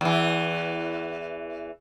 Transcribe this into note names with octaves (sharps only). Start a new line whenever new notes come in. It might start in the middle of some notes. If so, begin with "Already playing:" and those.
E2 E3